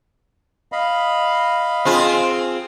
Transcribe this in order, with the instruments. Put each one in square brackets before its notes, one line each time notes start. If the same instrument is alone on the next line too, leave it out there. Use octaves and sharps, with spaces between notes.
[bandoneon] D#5 F5 B5
[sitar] C4 F4 G#4